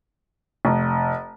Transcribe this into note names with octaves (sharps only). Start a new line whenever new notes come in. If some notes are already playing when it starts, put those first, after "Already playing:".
F1